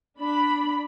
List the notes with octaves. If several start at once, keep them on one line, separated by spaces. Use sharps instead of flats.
D4 B5